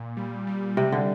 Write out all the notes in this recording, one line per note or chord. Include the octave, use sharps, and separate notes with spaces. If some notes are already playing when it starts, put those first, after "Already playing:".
Already playing: A#2
G3
G3
C3 G3
D3